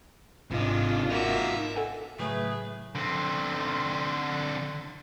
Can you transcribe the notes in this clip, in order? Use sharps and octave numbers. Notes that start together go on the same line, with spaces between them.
G#1 C3 D4 D#4 F4
A#3 D#4 F#4 E5
A4 F#5 G#5
A2 C#3 F#3 A3 G#4 B4
D3 C4